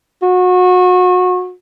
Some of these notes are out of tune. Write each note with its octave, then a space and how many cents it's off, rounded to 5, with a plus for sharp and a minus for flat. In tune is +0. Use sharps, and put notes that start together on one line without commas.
F#4 -30